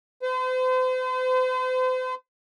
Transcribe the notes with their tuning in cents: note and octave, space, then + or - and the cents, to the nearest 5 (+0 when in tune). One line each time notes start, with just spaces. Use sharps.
C5 -40